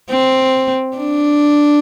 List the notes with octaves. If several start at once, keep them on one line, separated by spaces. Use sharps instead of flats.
C4
D4